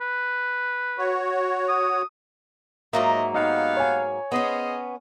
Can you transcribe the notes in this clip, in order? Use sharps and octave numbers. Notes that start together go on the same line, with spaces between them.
B4
F#4 C#5
D#6
G#2 F#3 A#3 D#4 F4 D#5 E5
B3 D#4 G4 F5
C#5 G#5
B3 C#4 G#4 C5 D#5